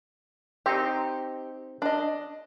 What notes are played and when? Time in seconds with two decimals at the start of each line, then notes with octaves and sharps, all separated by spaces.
0.66 C4 D#4 G4
1.82 D4 D#5